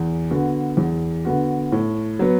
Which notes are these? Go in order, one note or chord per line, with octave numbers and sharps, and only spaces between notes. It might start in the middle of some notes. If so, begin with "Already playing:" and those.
Already playing: E2
D3 B3 F#4
E2
D3 B3 F#4
A2
F#3 B3